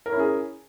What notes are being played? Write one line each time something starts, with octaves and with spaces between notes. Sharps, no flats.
C#4 E4 G#4 A#4 C#5